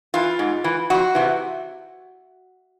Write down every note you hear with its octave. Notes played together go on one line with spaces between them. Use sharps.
E3 F4
G#2
E3
F2 F#4
C3 E3